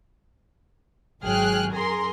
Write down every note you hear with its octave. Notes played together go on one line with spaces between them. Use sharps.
G#1 F#3 G#4 G5 F6 F#6
F#2 G#4 A#4 A#5 C6